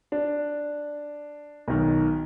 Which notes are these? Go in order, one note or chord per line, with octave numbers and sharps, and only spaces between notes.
D4
B1 D#3